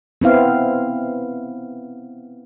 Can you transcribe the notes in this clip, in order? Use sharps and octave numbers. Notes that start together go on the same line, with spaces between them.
B3 C4 E4 F5